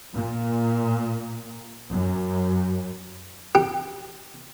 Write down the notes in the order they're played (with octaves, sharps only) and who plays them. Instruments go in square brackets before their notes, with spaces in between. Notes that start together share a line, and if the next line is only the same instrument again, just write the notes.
[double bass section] A#2
F#2
[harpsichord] G4